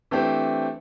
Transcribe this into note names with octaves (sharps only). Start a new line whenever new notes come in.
E3 A3 C4 D4 G4 C5